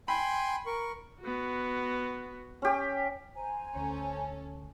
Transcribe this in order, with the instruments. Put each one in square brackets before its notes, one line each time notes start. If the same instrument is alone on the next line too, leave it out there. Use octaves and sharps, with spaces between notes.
[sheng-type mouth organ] G5 G#5 C6 [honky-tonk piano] B5
[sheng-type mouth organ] A#4 C#6
[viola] B3 F#4
[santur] C#4 G4
[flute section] C5 G#5 A#5
[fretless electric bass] D2 [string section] C#4 A4